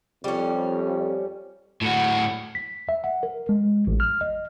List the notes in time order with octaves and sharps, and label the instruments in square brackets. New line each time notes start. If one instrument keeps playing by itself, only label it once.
[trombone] F2 [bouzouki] G3 C#4
[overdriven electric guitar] A2 F#4
[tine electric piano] B6
E5
F#5
A#4
G#3
A1
F6
D#5